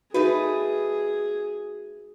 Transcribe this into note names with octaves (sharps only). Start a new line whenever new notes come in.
A3 D#4 F#4 G#4 B4